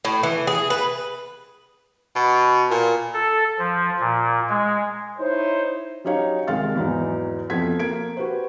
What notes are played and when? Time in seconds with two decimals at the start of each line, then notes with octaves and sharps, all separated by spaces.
0.05 A2
0.23 E3
0.47 G#4
0.70 B4
2.16 B2
2.71 A#2
3.13 A4
3.59 F3
3.99 A#2
4.49 G#3
5.19 D#4 E4 C5 C#5
6.04 F#3 C#4 D#4 G4 C#5 F5
6.47 C2 D#3 G#3 F5 F6 A6
6.75 E2 G#2 E3 F#3 D#4
7.50 F2 B2 F3 A4 G#6 B6
7.79 A#3 G#6 D7
8.17 F#4 G4 B4 C5